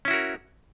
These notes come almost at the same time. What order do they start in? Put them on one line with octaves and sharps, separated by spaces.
C#4 E4 F#4 A#4